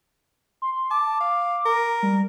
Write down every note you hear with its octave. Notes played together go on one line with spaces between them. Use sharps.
C6
A5 D6
F5
A#4
G3